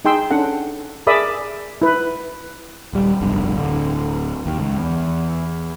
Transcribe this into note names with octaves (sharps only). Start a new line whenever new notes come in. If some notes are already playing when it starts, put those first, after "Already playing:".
D#4 G#4 G5 C6 E6
C#4 D4 A4 F#5
G#4 A#4 D5 E5 B5 D#6
E4 B4
D#1 G3
F1 B1 G2
D1 D3
D#2
C#2
E2